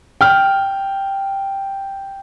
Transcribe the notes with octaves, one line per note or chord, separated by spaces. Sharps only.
G5 F6